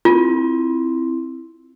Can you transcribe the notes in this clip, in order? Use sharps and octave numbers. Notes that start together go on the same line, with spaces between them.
C4 E4 F4